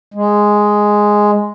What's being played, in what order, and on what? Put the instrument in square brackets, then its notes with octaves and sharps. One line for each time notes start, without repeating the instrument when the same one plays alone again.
[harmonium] G#3